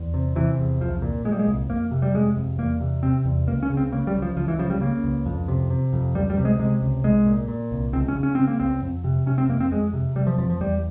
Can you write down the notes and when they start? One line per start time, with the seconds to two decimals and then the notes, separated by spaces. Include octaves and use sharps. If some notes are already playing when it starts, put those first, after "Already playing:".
Already playing: E2
0.14 C3
0.36 C3 E3
0.58 E2
0.80 C2 F3
1.02 A#2
1.25 A#2 G#3
1.32 G3
1.39 G#3
1.47 C2
1.69 F2 A#3
1.91 C3
2.02 G3
2.14 C3 G#3
2.37 F2
2.58 E2 A#3
2.80 C3
3.03 C3 C4
3.25 E2
3.47 C#2 A#3
3.63 C#4
3.70 C#3
3.77 C4
3.92 C#3 A#3
4.07 G3
4.15 C#2
4.22 F3
4.37 C#2 F3
4.48 E3
4.59 C#3 F3
4.70 G3
4.81 C#3 A#3
5.04 C#2
5.26 F2
5.48 C3
5.70 C3
5.93 F2
6.14 C#2 G3
6.30 G3
6.37 C3
6.45 G#3
6.59 C3 G#3
6.82 C#2
7.04 C2 G#3
7.26 A#2
7.48 A#2
7.71 C2
7.93 C#2 C4
8.08 C#4
8.15 C#3
8.23 C#4
8.35 C#3 C4
8.47 A#3
8.60 C#2 C4
8.82 F2
9.04 C3
9.26 C3 C#4
9.38 C4
9.49 F2 A#3
9.60 C4
9.72 F2 G#3
9.93 C3
10.16 C3 G3
10.27 F3
10.38 F2 F3
10.50 F3
10.61 E2 G3